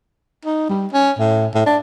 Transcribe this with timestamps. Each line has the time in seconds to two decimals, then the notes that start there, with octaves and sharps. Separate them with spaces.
0.45 D#4
0.70 G3
0.93 C#4
1.19 A2
1.55 A2
1.66 D4